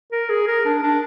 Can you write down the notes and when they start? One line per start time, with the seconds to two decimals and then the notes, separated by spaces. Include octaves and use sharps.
0.12 A#4
0.30 G#4
0.47 A#4
0.65 D4
0.83 D4